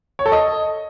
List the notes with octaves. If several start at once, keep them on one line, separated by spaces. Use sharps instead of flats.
C#5
A4
D#5